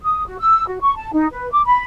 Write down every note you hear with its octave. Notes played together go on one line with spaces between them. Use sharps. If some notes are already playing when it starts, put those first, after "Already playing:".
D#6
F#4
E6
F#4
C#6
A5
D#4
B4
D6
B5